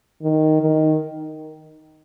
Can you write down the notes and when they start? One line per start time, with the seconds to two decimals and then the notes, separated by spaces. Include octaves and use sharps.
0.22 D#3
0.61 D#3